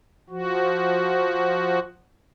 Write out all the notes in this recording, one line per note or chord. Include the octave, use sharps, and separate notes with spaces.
F3 F#4